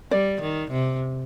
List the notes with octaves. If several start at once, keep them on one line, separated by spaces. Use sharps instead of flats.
G3 D5
D#3
C3